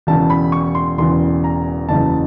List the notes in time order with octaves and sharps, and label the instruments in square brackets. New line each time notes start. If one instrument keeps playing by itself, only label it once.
[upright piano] E1 E2 C#3 A5
B5
C#6
C6
E1 E2 C#3 C6
A#5
F#1 E2 C#3 F#3 A5